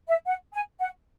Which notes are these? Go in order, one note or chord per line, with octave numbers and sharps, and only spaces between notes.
E5
F#5
G#5
F#5